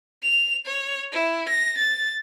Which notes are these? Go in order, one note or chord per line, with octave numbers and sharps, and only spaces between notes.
F7
C#5
E4
A#6
A6